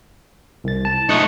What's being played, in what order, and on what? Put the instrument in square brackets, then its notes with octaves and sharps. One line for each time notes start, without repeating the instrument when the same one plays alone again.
[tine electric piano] C2 A6
A5
[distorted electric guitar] A3 D#4 [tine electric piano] C#6 F#6 C#7